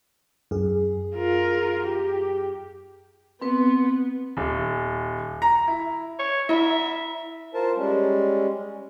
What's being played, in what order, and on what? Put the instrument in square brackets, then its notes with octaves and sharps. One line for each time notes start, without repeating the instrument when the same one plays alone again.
[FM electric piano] F#2 G#4
[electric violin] F4 A#4
G4
[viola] B3 [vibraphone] C4 B4
[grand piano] D#1
A#5
E4
[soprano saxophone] C#5
[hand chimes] E4 B5 [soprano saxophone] E5
[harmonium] F4 A#4 C5 A5
G3 G#3 C#4